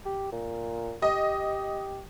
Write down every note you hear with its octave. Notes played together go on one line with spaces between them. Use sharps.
G4
A#2
G4 D#5